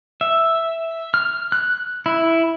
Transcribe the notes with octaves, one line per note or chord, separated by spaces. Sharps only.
E5
F6
F#6
E4